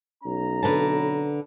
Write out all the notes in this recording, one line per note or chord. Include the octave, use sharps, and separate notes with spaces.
B1 C#4 A#5
D3 B4 A5